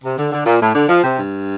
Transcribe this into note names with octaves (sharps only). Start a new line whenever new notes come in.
C3
D3
D3
A#2
A2
D3
F3
C3
G2